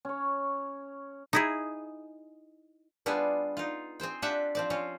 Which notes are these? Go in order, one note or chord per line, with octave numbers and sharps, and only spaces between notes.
C#4 C#5
D#4 E4 G#4
G3 B3 D4 F4 G#4
D#4 F4
C4 G#4 C5 G5
D4 F4 G4 E5 F#5
F3 C4 D5
C4 C#4 F4